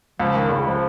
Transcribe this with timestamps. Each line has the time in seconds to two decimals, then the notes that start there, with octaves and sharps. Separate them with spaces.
0.20 C#2 F3
0.35 D#3
0.51 C#2 C#3
0.67 F3